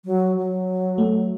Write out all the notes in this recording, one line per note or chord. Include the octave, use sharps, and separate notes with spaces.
F#3
F#3
A3